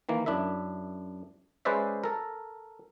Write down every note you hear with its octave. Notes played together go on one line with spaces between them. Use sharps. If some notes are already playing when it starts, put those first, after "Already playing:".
D#3 E3 A#3
F#2 D4 E4 E5
G#3 C#4 B4 C5 D5 E5
A4 A#4